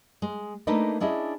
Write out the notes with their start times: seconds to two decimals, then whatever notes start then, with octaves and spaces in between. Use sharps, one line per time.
0.22 G#3
0.67 A3 A#3 D4 D#4 A#4 B4
1.00 C#4 D4 E4 G#4 D#5